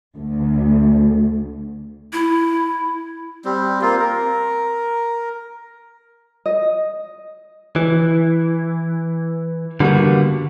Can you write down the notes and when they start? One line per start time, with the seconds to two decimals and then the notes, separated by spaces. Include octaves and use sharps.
0.16 D2
2.13 E4
3.45 G3 C4
3.81 A#3 C4 F4
4.00 A#4
6.46 D#5
7.76 E3
9.80 D3 G3 A#3 B3 F#4